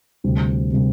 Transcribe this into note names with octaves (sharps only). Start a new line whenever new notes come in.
D2 C3 G3 C4
C3 G3 C4